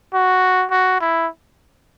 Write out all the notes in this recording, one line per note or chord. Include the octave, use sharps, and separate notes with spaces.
F#4
F#4
E4